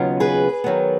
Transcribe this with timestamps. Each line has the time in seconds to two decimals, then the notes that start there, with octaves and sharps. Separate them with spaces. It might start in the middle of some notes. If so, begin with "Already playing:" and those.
Already playing: D#2 C#3 F#3 B3 F4
0.20 G#4 B4
0.64 D#3 F#3 B3